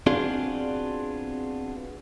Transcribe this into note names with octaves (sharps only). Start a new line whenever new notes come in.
B3 C4 D4 F4 F#4 G#4